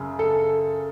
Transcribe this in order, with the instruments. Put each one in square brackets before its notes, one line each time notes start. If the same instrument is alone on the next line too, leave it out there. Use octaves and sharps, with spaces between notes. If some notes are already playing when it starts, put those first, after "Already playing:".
Already playing: [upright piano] F#2 C#3
A4